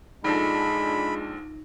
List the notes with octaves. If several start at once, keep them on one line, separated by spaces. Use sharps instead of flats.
A#1 F3 G#3 D4 D#4 A4 B5 A#6